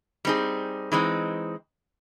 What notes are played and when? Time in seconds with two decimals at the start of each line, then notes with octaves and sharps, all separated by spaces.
0.25 G3 C4 D#4 G#4
0.92 E3 G#3 C4 D#4